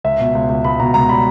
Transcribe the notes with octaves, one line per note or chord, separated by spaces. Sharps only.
C#2 E5
B2
C#2
C#2
C#2 B5
B2 A#5
C#2 A#5
G3 B5